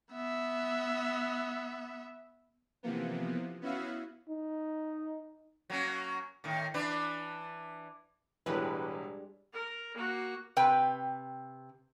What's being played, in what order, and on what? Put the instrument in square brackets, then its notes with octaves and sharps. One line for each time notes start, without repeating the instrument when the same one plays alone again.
[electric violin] B3 E5
[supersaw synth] C3 E3 F3 A#3 B3
B3 C#4 E4 F#4 E5 F5
[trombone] D#4
[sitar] F#3 A#3 C#4
A2 D#3
E3 D4 B4
[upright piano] E1 E2 A2 [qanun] G3 G#3 D4 [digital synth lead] B4
[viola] A#4
A#3 F#4
[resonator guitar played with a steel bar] C3 B4 G5